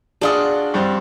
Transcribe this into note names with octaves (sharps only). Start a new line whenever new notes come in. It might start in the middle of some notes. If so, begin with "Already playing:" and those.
D4 F4 F#4 G#4 D5 D#6
G2 G3 C4